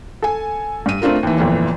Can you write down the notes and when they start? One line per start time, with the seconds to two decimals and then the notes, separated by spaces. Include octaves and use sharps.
0.22 A4 G#5
0.86 G2 D#7
1.02 A3 C4 D4 F4 A#4
1.23 D#2 E3
1.38 G1 F2 A#2 E3